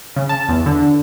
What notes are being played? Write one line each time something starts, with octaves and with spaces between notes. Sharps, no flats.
C#3
A5
E2
D3